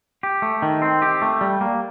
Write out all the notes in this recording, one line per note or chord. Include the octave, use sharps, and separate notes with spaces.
G4
A3
D#3
C4
G4
A3
G3
A#3